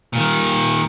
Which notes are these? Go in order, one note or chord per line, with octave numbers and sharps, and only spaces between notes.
A#2 D#3